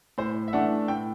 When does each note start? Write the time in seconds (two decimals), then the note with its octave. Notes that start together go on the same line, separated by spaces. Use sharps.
0.18 A2 C5
0.48 E5
0.53 E3 A3 D4 F#5
0.88 A2 G5